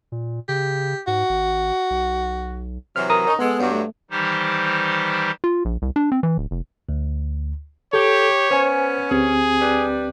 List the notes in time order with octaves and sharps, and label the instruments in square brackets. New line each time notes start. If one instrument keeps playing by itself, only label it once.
[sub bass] A#2
[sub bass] C#3 [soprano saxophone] G4
[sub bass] G#2 [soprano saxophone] F#4
[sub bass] G#1
B1
[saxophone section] C3 E3 F#3 [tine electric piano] F6
[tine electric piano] A#4 A#5 D#6
[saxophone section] C#4 D#4
[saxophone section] G#3 A4 [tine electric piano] B3
[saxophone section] G2 F#3
[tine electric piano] A3
[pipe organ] D#3 E3 G3 D#4 G4 C5
[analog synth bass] F4
A#1
C2
D4
C4
E3
D1
F1
[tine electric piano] D2
[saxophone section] G4 [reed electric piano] A4 [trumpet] C#5
[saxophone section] B3 C#4 [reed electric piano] C5 G#5
[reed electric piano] D2 C4 G4 [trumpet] G#4
[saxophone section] G3 D4 B4